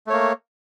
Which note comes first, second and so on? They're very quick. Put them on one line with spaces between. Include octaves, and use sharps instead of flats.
A3 C#5 A#3